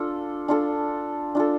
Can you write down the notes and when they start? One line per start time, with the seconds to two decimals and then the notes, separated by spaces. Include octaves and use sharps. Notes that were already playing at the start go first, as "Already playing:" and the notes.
Already playing: D4 F4 A4
0.48 D4 F4 A4
1.35 D4 F4 A4